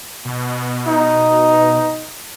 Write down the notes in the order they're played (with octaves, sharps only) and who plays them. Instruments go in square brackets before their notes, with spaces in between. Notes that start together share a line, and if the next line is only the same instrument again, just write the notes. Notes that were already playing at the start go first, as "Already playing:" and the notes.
[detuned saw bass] B2
[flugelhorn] D#4